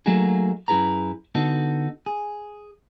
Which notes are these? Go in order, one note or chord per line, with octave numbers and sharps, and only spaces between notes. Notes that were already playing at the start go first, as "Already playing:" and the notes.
F#3 A3 A#3 D#4 F#4 G#4
F#2 E4 G#4 B4 A#5
D3 B3 D#4 F#4 A4
G#4